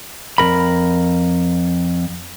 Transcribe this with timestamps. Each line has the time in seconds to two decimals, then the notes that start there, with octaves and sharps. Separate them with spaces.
0.38 F2 B2 A#4 B5